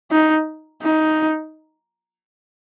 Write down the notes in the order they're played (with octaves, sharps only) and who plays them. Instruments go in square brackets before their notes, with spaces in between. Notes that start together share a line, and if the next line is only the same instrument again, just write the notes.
[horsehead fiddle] D#4
D#4